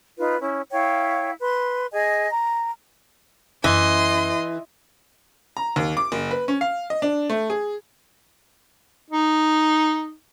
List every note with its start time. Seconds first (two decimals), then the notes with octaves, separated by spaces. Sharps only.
0.18 D#4 F4 B4
0.40 C#4 E4
0.70 E4 C#5 F5 G5
1.40 B4 C6
1.91 G#4 D#5 G#5
2.28 A#5
3.64 F#2 E3 C#4 D#5 C6
5.57 A#5
5.76 D#2
5.97 D6
6.12 F#1
6.31 B4
6.48 C#4
6.61 F5
6.90 D#5
7.02 D4
7.29 A3
7.50 G#4
9.10 D#4